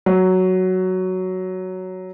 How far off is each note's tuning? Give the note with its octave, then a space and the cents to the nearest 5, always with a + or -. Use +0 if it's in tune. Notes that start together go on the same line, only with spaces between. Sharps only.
F#3 +5